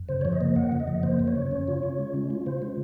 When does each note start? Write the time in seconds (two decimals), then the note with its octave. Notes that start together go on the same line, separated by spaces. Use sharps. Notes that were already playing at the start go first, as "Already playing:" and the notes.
Already playing: F#2
0.09 C#3 C5
0.21 F3 C#5
0.33 D#5
0.41 A#3
0.56 F#2 F#5
0.72 C#3
0.80 D#5
0.87 F3
1.03 A#3 C5
1.19 F#2
1.28 C#5
1.36 C#3
1.51 C#4
1.68 F4
1.83 C#3
1.99 G#3
2.14 C#4
2.30 F4
2.46 C#3 C5
2.62 G#3